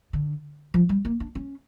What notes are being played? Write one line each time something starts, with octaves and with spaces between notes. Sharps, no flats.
D3
F3
G3
A#3
D4
C#4